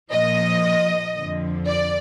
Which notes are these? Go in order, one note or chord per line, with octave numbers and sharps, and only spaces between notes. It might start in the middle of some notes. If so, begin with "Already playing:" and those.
A#2 F3 D#5
F2 D3 F3
D5